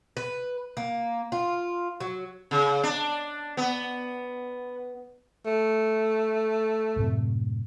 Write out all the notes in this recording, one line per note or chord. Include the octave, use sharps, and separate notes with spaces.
B4
A#3
F4
F#3
C#3
D4
B3
A3
F#2 A2 C3